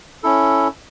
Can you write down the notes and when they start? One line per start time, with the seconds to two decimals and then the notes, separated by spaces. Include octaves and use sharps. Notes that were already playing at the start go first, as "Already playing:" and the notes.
0.23 C#4 E4 A4